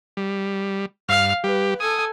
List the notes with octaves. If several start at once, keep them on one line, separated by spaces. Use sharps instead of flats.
G3
G2 F5 F6
G3 G4 B4
A4 G#5 D#6